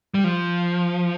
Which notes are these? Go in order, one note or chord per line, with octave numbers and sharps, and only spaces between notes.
G3
F3